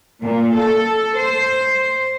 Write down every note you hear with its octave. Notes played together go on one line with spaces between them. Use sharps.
A#2
A4
C5